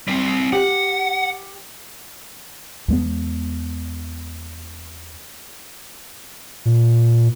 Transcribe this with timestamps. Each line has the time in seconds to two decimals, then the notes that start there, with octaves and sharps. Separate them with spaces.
0.08 G3 C4
0.53 G4 F#5
2.88 E2 G#3 B3
6.65 A#2